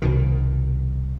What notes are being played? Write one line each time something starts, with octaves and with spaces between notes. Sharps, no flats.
C2 B2 D#3